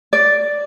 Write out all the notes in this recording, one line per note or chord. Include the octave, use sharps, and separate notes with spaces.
D5